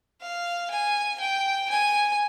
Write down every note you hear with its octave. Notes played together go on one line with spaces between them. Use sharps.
F5
G#5
G5
G#5